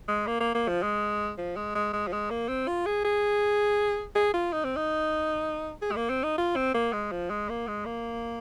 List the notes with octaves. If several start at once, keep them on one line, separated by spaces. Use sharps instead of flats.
G#3
A#3
A#3
A#3
F3
G#3
F3
G#3
G#3
G#3
F3
G#3
A#3
C4
F4
G#4
G#4
G#4
F4
D#4
C4
D#4
G#4
G#3
A#3
C4
D#4
F4
C4
A#3
G#3
F3
G#3
A#3
G#3
A#3